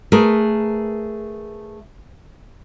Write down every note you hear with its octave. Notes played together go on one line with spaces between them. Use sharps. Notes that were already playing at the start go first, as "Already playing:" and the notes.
A3 G#4 A#4 B4